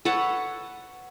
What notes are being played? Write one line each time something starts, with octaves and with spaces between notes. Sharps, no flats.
A4 B4 C#5 F#5